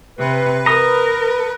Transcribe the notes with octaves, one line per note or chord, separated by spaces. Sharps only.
C3 B4
A#4 A#5 D#6